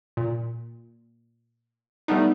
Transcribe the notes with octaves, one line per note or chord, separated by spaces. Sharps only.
A#2
G3 A3 B3 D4 D#4